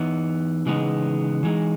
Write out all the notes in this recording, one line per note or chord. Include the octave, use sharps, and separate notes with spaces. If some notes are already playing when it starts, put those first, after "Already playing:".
Already playing: E3 B3 D#4
C#3 E3 G#3 B3 D#4
E3 G#3 D#4